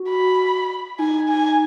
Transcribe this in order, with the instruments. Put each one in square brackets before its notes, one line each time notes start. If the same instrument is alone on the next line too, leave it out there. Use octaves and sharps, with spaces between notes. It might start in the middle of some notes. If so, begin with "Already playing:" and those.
Already playing: [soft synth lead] F#4
[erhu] B5
[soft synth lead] D#4 [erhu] G#5
[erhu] G#5